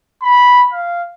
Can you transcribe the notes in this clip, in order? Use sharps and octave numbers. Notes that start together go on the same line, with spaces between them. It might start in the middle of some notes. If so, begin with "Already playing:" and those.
B5
F5